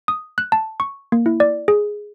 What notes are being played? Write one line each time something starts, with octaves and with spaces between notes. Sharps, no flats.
D#6
F#6
A5
C#6
A#3
E4
D5
G#4